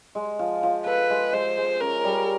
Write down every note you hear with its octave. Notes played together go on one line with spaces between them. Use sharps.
G#3
F3
F3
A4 B4
G#3
G#3 C5
G#3
C#4 A#4
G3